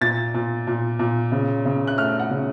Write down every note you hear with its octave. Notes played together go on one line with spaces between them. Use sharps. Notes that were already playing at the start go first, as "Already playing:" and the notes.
A#2 A6
A#2
A#2
A#2
C#3
C#3
F#6
A3 F6
F#5
C#3